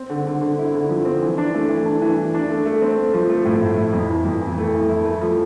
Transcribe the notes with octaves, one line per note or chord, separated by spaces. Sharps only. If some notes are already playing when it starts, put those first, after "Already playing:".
Already playing: C4
D3
D3
D3
E4
D3
F3
C4
E3
D4
A3
E3
D4
E3
E3
D4
A3
A3
C4
A3
F3
A3
A2
A2
E4
F2
E3
F2
E3
A3
E3
E4
A3
F3